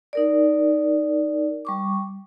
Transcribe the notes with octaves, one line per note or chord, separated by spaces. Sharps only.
D#4 A#4 D5
G3 C#6 D6